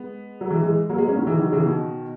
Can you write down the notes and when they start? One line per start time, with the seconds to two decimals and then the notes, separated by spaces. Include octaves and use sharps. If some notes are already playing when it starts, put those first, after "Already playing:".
Already playing: G#3 B3
0.41 F#3
0.50 E3 G#3
0.63 E3 G#3
0.90 F#3 A#3
0.98 G#3 B3
1.08 A#3 C#4
1.17 D#3 F#3
1.27 C#3 E3
1.39 D#3 F#3
1.52 C#3 E3
1.65 B2 D#3